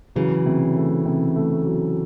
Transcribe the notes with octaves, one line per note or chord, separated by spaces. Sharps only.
C#3 E3 F#3
C3
A3
C3
A3
F#3